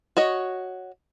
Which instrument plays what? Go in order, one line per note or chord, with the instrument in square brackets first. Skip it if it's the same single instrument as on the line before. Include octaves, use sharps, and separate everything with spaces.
[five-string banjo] F#4 C#5 D#5